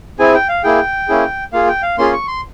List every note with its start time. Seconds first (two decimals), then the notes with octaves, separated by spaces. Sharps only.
0.19 C4 E4 G#4 G#5
0.34 G5
0.49 F5
0.64 A#3 E4 G#4 G5
1.08 A#3 C#4 E4 G#4
1.53 A#3 F4 G#4 F5
1.69 G5
1.83 F5
1.98 A#3 C#4 F4 G#4 C6
2.13 C#6
2.28 C6